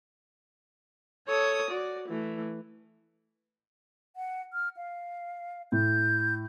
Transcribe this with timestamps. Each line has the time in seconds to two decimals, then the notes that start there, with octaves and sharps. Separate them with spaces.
1.26 A4 C#5 D#6
1.69 F#4 D5
2.06 E3 A3
4.16 F#5
4.53 F6
4.77 F5
5.72 A2 G6